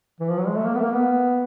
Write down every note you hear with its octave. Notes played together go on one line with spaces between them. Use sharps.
E3
F3
F#3
G#3
A3
A#3
B3
A3
A#3
B3